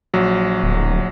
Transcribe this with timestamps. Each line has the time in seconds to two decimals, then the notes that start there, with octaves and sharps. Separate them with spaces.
0.14 A#1 F#3
0.63 D1